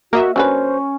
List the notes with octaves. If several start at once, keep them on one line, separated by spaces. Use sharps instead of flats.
A#3 F#4 A#4 D#5 E5
F#3 C#4 D4 B4 C5